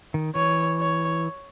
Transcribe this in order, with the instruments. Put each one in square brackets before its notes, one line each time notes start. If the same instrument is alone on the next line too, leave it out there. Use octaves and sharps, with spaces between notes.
[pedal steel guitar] D#3
[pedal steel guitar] E3 [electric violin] C#5
[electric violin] C#5